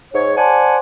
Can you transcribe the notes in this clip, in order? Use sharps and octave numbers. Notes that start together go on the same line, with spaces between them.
G#2 C#5
C5 D5 F#5 G#5 A5